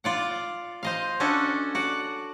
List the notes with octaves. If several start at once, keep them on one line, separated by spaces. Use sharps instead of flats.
F4 D5 F#5
C5 D#5 F5
C#4 D4 F#4 A4 D#5
F#4 D5 F#5